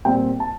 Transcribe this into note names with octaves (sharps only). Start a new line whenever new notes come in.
A#2 G3 C4 G5
A5